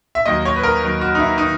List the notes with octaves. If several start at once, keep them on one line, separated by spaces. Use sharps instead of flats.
E5
D#2 D#3 F#3 D#5
C#5
B4
A#4
D#2 D#3 F#3
F#4
D#4
E4
D#3 D#4